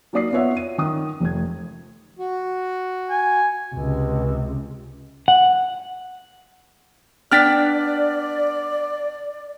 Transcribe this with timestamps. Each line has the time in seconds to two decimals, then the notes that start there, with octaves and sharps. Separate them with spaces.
0.13 F#3 A#3 D#4 D5 D#6 C7
0.32 B3 F4 C#5 E5 F#5
0.57 D#7
0.78 D#3 D#6
1.20 F1 A3 G#6
2.19 F#4
3.10 G#5
3.74 C#2 C3
5.28 F#5
7.32 B3 D4 D5 G5 F6 A6 B6